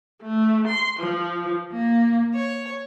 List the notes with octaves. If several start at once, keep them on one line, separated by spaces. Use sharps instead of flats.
A3
C6
F3
A#3
C#5